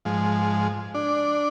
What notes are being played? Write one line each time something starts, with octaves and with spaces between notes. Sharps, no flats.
G#2 F3 G#3
D4